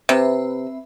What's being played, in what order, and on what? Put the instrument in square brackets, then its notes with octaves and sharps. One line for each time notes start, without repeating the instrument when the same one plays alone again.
[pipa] C3 [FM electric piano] C4 B4 E5